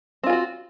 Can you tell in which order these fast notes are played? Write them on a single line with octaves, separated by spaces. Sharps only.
C4 F4 G#4 F#4